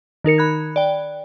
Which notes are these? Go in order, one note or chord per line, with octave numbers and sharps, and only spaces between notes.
D#3 D#4 A#4 C#7
B5 F#6 G#6
D5 G5